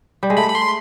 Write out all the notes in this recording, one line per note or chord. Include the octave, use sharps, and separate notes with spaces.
G3
G#3
A3 B5
B5
C6